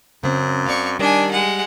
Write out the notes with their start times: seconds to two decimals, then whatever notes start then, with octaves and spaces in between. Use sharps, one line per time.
0.24 F#2 C#3 C4
0.66 C4 D5 F5 C#6
0.99 D#3 G3 D4 G#5
1.31 G#3 F#5